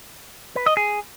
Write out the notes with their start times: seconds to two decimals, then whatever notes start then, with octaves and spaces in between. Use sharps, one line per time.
0.56 B4
0.66 D#5
0.77 G#4